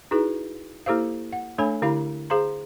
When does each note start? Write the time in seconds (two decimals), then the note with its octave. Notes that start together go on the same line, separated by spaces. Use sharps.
0.11 D#4 E4 F#4 G#4 B4
0.86 A#3 E4 G4 A4 C5 F5
1.33 F#5
1.58 A3 D4 A4 C#5 G#5 B5
1.82 D3 E4 G4 F5 B5
2.30 G#4 C5 F5 A#5 C6